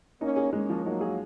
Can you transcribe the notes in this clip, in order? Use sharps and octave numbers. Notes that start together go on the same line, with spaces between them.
A#3 C#4 D#4
G#4
G#3 A#3 C#4
F3
F#3 A#3 D#4
G#4